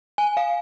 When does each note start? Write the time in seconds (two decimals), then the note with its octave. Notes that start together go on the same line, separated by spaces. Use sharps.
0.18 G#5
0.37 F5